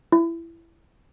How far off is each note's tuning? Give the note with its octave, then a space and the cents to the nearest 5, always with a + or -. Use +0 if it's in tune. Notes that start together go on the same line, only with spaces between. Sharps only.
E4 +20